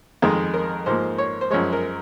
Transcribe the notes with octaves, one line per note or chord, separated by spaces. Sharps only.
F2 D#3 G#3
A#4
G#2 F3 A#3 C5
C#5
C5
F#2 F3 G#3 C#5
A#4